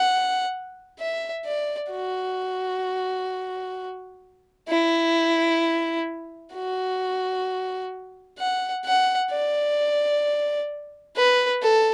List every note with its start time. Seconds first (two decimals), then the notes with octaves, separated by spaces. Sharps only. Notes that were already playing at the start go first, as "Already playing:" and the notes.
Already playing: F#5
0.99 E5
1.45 D5
1.92 F#4
4.69 E4
6.54 F#4
8.39 F#5
8.85 F#5
9.31 D5
11.16 B4
11.62 A4